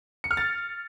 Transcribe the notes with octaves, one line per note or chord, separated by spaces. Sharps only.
C#7
F6
A6